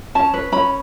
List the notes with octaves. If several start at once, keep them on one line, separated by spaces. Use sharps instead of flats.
C#4 A5
B4
C#4 B5